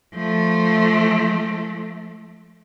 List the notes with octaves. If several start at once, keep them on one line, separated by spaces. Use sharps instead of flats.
F3 A3